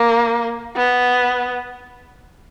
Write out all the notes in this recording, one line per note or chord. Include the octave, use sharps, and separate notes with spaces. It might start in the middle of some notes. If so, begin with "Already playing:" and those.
Already playing: A#3
B3